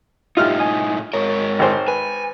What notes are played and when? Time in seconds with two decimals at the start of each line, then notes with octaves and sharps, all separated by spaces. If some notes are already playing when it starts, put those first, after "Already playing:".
0.37 A2 D#4 F4 G4 E5 F6
0.59 D#5 G#5 D#6
1.14 G#2 A#4 C#5 C#6
1.59 G#1 C5
1.88 B4 G#5